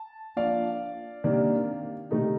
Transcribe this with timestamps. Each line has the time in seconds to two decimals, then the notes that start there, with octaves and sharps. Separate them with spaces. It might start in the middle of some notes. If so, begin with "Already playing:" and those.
Already playing: A5
0.36 F3 A#3 D4 D5 F5
1.24 C3 D#3 A#3 D4
2.11 C3 D#3 A3 D#4